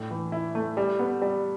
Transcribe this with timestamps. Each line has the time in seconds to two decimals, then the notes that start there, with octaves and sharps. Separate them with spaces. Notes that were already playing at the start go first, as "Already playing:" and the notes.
Already playing: A2 D4
0.11 E3
0.32 E4
0.55 A3
0.77 G3
0.99 B3
1.22 G3